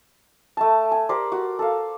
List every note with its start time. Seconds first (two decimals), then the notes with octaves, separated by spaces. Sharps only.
0.57 A3 A5
0.92 G#5
1.09 G4 A#4 C5 D5
1.32 F#4
1.59 A4 F5